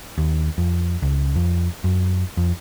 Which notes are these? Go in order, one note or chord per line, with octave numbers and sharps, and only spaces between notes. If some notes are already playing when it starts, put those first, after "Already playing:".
D#2
F2
C#2
F2
F#2
F2